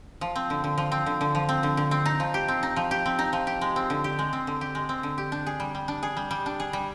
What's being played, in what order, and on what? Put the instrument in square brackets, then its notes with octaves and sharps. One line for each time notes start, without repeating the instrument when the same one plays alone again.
[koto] F3
C4
D3
D3
F3
C4
D3
D3
F3
C4
D3
D3
C4
D#4
F3
G4
C4
D#4
F3
G4
C4
D#4
F3
G4
G#3
C4
D3
G4
G#3
C4
D3
G4
G#3
C4
D3
G4
D4
G#4
G3
G3
D4
G#4
G3
G3
D4
G#4
G3